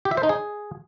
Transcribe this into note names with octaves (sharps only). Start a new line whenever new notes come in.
G4
E5
C5
D#4
G#4